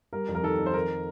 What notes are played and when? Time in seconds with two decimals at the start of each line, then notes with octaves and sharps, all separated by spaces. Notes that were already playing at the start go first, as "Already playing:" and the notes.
0.13 G3 A#4
0.28 F2
0.35 A#4
0.43 D#3 A4
0.59 F2
0.66 C5
0.73 D#3 A#4